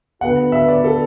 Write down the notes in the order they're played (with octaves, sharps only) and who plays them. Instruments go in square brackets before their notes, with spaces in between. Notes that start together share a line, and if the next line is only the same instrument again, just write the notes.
[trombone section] D3 B3 F#4 B4 [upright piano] F#5
[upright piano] E5
D5
A4